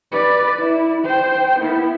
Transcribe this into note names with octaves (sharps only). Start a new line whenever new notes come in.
B4 D5
E4
C5 G5
B3 E4